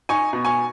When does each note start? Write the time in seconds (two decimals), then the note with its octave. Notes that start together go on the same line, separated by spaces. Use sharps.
0.09 D#4 G#5 C#6
0.33 B2
0.45 G#5 C#6